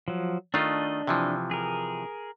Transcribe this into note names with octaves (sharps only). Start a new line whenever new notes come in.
F3 F#3
D#3 A3 D4 F4 D#5
C3 E3 F3
G#4 A#4